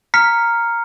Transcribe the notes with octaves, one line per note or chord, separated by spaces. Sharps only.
A#5 F6 B6 C#7